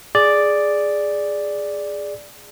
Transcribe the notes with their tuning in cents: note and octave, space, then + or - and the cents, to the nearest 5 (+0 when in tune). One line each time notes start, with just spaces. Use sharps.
G#4 +0 D5 +0